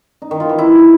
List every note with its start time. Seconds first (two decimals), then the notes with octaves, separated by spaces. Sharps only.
0.22 D#4
0.31 D#3
0.40 F4
0.49 E3
0.58 E4